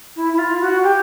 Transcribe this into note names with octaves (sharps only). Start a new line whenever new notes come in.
E4
E4
F4
F#4
G4